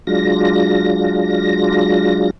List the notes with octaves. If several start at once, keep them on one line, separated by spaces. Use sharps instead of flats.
F#3 G#3 D4 F4 A#6